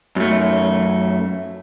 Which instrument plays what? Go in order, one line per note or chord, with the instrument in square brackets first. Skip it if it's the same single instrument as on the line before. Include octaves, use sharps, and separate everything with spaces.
[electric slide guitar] F#2 A3